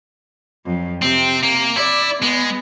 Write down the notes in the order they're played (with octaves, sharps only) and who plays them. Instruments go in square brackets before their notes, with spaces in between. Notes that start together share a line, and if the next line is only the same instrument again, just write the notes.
[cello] F2 F#3
[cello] C3 [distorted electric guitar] C4
[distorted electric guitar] A#3
[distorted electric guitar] E4 [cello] D5
[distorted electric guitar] G#3 [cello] B3